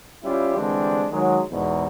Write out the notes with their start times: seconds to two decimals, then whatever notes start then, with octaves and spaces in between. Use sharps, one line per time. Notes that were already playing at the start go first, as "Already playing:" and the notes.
0.24 G3 C#4 E4 F4 G4
0.55 D3 E3 G3 G#3 C4 D4
1.11 D#3 F#3 G#3
1.51 E2 G#2 B2